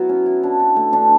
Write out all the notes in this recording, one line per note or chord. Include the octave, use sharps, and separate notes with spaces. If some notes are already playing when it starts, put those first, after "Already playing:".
Already playing: F#3 B3 E4 F#4
C#4
E4
D4
F#4
A3
D4